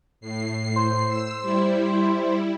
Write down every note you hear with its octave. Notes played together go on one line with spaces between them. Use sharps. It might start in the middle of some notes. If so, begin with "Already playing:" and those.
A2 C7
C5
E6
G3 E4